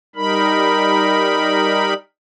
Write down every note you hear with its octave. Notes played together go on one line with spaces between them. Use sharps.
G3 D#4 A#4 B5